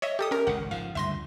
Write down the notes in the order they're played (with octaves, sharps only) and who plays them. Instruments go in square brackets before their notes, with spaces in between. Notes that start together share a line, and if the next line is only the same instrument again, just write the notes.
[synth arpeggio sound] C#5 D#5 E5
G4 A4 D#6
C#4 A#4
[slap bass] G#1 C#2 [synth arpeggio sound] F#5
[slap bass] G#2 F3 [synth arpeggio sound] F5
[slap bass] D2 G2 C#3 [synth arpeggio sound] E5 C6 A#6